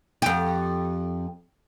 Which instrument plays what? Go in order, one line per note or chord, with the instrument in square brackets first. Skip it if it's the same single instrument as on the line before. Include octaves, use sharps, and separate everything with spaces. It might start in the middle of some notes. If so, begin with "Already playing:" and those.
[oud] F2 G4